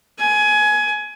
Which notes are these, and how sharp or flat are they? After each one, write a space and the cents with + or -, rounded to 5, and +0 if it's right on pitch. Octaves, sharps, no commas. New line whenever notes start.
G#5 +20